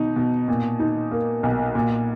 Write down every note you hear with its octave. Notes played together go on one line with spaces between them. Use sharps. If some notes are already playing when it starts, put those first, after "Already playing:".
Already playing: B2 D#4
B2
A#2
D#4
A#3
B1
A#2